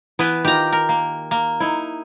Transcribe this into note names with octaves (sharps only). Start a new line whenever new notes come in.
E3 B3 B4
D#3 F4 G4 A#5
A#4
A#3
A#3
D#4 E4